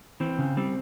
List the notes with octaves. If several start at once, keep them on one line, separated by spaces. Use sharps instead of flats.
E3 C4
C#3
G3 C4